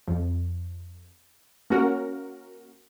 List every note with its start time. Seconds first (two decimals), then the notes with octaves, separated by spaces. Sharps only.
0.07 F2
1.70 A#3 C#4 F#4 A#4